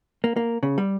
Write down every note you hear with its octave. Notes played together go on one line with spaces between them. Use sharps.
A#3
A#3
C#3
G3